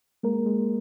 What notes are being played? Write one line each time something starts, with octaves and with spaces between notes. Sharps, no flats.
G#3 A#3 A#4
G#3